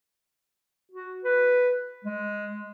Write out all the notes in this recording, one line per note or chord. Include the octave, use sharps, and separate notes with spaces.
F#4
B4
G#3